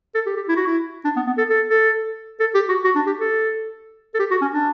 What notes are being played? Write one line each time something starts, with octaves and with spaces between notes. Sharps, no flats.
A4
G4
G4
E4
F#4
E4
D4
B3
B3
A4
A4
A4
A4
G4
F#4
F#4
D4
G4
A4
A4
G4
F#4
C#4
D4